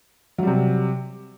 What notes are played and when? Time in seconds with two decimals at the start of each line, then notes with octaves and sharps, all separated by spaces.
0.38 F#3
0.43 G3
0.47 C3